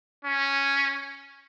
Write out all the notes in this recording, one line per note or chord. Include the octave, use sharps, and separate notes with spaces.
C#4